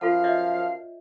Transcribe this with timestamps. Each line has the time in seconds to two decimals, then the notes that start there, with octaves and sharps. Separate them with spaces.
0.01 F#2 F3 F4 A4 F5 F#5
0.24 C#5 D#5 E5